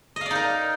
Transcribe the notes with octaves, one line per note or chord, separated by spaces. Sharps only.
D#4 A#4 D5 D#5 F5